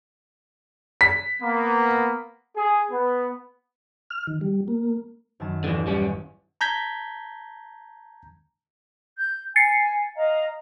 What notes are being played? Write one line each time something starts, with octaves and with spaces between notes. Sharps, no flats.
B6
A#3 B3
G#4
B3
F6
D#3
G3
A#3
F#2 D#3 A5
A1 D#2 D3 E3 E7
G3 C#4
A5 A#5 G6 G#6 B6
G6
G#5 A6 C7 C#7
D#5 F5 A#5